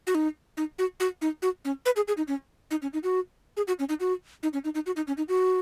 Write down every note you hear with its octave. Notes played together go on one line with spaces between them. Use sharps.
F#4
D#4
D#4
F#4
F#4
D#4
F#4
C#4
B4
G#4
G#4
D#4
C#4
D#4
C#4
D#4
F#4
G#4
F#4
C#4
D#4
F#4
D#4
C#4
D#4
D#4
F#4
D#4
C#4
D#4
F#4